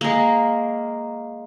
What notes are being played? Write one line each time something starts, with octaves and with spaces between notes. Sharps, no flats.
G#3 A#3